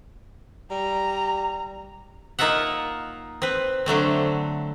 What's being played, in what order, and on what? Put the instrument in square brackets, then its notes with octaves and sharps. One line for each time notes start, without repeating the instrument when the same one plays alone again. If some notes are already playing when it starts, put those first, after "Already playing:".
[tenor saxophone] G3 [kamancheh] A#5
[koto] A#3 D#4 F4 E5 F#5
C4 B4
D3 F#3 A3 C4